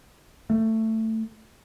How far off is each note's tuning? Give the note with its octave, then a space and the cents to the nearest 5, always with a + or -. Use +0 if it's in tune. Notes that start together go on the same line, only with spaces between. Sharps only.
A3 +15